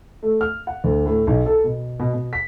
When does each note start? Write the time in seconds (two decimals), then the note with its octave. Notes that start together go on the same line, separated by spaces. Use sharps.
0.23 A3
0.41 F6
0.67 F#5
0.84 D2
1.06 A2
1.27 B1
1.46 A4
1.64 B2
2.00 B2
2.14 B2
2.33 B6